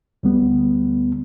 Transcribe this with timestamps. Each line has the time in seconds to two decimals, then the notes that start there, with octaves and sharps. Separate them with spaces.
0.23 D2 G3 B3